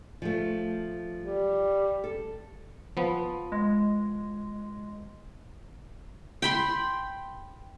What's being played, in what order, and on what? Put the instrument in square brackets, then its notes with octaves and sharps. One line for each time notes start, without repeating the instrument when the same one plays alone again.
[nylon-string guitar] F3 A3
[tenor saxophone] G3
[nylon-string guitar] A4
[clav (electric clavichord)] F3 B3
[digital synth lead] G#3
[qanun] G5 B5 C6